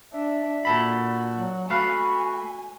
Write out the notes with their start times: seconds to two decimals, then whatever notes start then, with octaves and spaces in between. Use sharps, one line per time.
0.13 D4 E5
0.65 A#2 F#4 A4 B5
1.33 F#3
1.70 A3 F#4 B4 F5 G#5